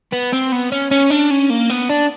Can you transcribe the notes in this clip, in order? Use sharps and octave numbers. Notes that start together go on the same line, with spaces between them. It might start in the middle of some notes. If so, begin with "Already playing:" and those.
B3
C4
B3
C#4
C#4
D4
C#4
A#3
B3
D4